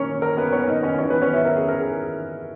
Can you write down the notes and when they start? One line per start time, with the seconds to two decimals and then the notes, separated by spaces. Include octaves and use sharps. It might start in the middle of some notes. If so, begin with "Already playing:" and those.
Already playing: A#2 C#4 A#4 C#5
0.22 A#4
0.37 B3 B4
0.53 C#4 C#5
0.68 D#4 D#5
0.83 C#4 C#5
0.99 E3 B3 C#4 D#4 C#5
1.10 B3 B4
1.22 C#4 C#5
1.33 E4 E5
1.45 A#4
1.56 G#4
1.68 A#4
1.81 G#4